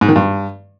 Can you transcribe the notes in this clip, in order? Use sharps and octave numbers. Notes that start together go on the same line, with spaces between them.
G#2
D#3
G2